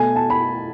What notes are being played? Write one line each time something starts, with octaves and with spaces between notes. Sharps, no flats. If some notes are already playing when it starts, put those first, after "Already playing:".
Already playing: B2 A3 G#5
A5
B5